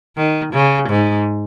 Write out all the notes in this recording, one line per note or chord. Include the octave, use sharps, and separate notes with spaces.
D#3
C#3
G#2